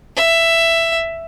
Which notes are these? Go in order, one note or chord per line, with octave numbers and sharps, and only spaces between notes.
E5